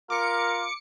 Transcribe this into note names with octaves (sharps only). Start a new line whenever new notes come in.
F4 A#4 D6 C#7